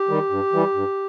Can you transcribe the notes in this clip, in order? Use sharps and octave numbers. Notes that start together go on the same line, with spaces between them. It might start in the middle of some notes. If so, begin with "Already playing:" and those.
Already playing: G4
D#3 G3
G2
E3 G3
G2